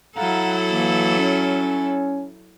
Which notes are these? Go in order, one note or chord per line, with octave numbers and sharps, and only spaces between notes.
F#3 E4 A4 F5 F#5 A#5
F2 E3 A#3
C#4